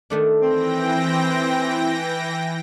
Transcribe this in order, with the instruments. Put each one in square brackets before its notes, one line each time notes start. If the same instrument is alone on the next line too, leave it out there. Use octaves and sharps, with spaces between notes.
[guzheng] D#3 A3 D4
[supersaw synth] E3 G5 A#6 [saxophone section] C4